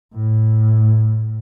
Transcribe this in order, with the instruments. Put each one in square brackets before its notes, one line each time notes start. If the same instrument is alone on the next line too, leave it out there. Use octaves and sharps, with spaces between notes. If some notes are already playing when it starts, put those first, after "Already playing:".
[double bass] A2